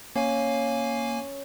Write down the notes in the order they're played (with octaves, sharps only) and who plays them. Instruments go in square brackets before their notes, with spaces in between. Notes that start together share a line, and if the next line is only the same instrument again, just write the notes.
[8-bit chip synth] A#3 F5 G#5 [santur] C#4